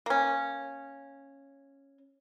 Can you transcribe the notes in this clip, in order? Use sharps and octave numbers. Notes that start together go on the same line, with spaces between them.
A#3 C#4